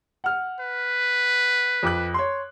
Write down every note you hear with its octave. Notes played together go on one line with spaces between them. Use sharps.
F#5 F6
B4
F2 D6 F#6
C#5 C6